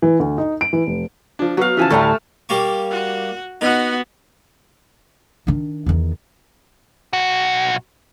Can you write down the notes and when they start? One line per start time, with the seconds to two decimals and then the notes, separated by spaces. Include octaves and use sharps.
0.02 E3
0.20 D2
0.38 D#4
0.61 D7
0.73 E3
0.87 F1
1.39 F3 D4
1.57 F#3 B3 F#4 F5
1.77 C#3 E3 F3 E5 G#5 A5
1.90 D2 A2 G3 A3 F5 A5 A#5
2.49 G3 A#3 C#6
2.91 F#4
3.61 B3 D#4 F#4
5.47 D#3 D4
5.86 E2 D#3
7.13 B1 F#4